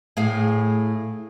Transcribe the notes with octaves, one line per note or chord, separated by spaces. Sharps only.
A2 G#4 F5